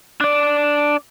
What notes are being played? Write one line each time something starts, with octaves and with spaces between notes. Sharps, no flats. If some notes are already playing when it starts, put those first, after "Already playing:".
D4 D5